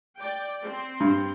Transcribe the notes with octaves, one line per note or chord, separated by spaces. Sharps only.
D5 G5
C4 C6
G2